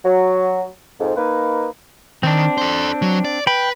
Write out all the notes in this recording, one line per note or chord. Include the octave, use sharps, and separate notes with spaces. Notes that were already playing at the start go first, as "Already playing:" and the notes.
F#3
F2 G#2
A#3 D#4 B4
D#3 C4 D4
A4 C5
F#3
D5
B4 G5 B5